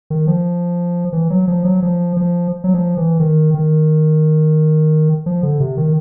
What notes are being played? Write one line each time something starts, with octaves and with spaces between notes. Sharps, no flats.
D#3
F3
E3
F#3
F3
F#3
F3
F3
F#3
F3
E3
D#3
D#3
F3
D3
C3
D#3